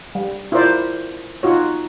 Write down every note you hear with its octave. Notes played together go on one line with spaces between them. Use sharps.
G3
E4 F4 A#4 C5 D5
D#4 F4 F#4 C#5